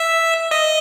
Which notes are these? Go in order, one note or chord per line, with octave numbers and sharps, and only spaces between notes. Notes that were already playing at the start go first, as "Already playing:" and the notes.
Already playing: E5
D#5